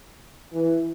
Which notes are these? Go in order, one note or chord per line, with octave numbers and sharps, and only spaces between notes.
E3